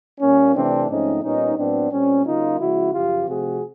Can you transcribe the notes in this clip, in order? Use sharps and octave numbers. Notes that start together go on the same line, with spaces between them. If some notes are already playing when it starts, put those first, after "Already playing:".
A#2 G3 A#3 C#4
C3 E3 A3 C4 D4
G#2 F3 A3 C4 C#4 D#4
A#2 G3 B3 C#4 D#4
A2 F#3 B3 C4 D4
A#2 G3 C4 C#4
C#3 F#3 A#3 D#4 F4
C#3 F3 G#3 E4 F#4
F#2 C#3 F3 F4 G4
C3 F3 A3 C4 F#4 G#4